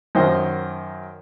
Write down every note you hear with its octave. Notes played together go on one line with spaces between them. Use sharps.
F#2 D#3 C5 D#5